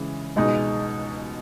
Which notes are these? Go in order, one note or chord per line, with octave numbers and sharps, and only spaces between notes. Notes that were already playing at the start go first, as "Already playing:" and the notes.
Already playing: C#3 E3 G#3
C#2 B2 G#3 D#4